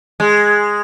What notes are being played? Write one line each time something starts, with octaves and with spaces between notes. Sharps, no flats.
G#3